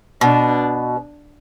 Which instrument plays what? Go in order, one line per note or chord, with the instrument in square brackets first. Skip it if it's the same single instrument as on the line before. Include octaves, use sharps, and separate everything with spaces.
[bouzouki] B2 [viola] D4